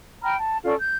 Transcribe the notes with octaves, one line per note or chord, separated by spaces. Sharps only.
G5 A#5 B5 F6
A5
C#4 F4 A4 D5
G6